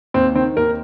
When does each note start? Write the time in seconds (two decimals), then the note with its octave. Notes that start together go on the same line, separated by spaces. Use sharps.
0.14 D#2 C4
0.35 D#3 C4
0.57 D#2 A#4